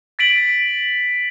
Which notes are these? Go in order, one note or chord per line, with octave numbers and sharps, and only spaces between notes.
A6 B6 D7 F#7